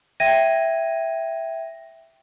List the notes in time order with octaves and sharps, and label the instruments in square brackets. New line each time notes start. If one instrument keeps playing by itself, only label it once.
[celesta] E5 G5 G#6 A#6 D#7